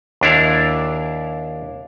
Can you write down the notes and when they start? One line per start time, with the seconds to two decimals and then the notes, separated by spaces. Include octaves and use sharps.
0.21 D#2 D4 E4 F5